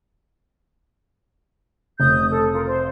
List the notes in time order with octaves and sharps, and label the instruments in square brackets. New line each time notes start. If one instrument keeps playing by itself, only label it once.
[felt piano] F1 [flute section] D#6 G6
[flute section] A4
F4 A#4
C5